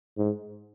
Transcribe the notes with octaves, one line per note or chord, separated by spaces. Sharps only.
G#2